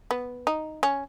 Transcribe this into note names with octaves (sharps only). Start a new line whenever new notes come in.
B3
D#4
C#4